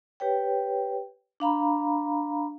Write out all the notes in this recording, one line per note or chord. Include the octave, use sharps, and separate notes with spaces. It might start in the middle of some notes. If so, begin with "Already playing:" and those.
G4 B4 C#5 G5
D4 F5 A#5 B5